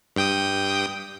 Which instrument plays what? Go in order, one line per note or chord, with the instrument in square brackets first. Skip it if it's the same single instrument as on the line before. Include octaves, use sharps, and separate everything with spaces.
[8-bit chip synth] G2 G5 D#6